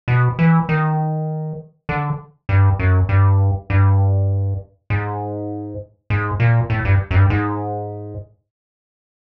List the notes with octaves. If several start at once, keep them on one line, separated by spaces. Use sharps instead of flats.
B2
E3
D#3
D3
G2
F#2
G2
G2
G#2
G#2
A#2
A2
G2
F#2
G2
G#2